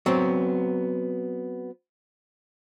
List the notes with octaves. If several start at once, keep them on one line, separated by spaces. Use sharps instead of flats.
F#3 B3 C4